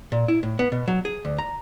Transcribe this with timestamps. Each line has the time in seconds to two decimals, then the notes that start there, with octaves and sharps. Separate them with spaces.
0.12 A#2
0.28 E4
0.43 A2
0.59 B3
0.72 B2
0.88 F#3
1.05 G#4
1.25 D2
1.38 A#5